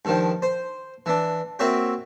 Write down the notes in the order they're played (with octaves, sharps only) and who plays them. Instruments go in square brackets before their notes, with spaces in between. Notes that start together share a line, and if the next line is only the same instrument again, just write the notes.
[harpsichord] G2 D#3 F3
C5
E3 D4
A#3 C4 F#4 C#5 E5 G5